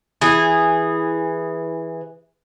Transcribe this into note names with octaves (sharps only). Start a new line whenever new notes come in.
E3 G#4